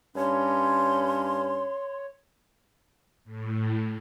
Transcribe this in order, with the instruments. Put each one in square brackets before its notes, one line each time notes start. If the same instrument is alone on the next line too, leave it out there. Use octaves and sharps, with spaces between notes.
[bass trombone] G2 [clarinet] C#4 [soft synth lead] C#5 [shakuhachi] C6
[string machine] A2